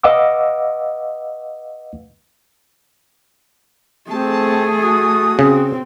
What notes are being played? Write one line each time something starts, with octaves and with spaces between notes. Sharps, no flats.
B4 D#5 F5 F#5 D6 E6
A3 C4 G#4 A5
F#4 D#6
C#3 C4